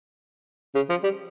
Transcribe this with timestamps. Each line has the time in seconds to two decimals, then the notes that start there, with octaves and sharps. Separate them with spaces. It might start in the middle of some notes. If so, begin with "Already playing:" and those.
0.75 C#3
0.90 F3
1.04 G3